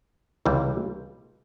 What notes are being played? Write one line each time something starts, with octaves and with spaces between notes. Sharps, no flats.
C#2 C3 E3 G3